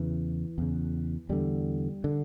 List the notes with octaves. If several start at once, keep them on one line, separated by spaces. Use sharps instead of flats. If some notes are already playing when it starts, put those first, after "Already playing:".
Already playing: E2 C#3 E3
E2 C#3
E2 D3 G3
D3